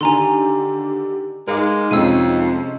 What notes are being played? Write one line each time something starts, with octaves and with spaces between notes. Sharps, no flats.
D3 D#3 G4 G#5 A#5 C6
G#3 D#4 A#4 F5 D6
F2 C3 G#3 C#4 E6 D#7